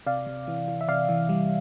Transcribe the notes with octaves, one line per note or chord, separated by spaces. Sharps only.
C3 D5 F5
C3
E3
E3
E5
C3 D5 F5
E3
G3